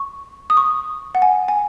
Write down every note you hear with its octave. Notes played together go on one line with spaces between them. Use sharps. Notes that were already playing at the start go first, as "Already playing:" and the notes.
Already playing: C#6
D#6
C#6
F#5
G#5
G#5